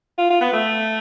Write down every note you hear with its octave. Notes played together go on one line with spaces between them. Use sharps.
F4
F4
B3
A3